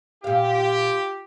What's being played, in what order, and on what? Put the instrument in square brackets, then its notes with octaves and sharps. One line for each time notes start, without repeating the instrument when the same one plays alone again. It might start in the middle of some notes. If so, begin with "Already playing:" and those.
[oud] A#2 F5 [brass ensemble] F4 G4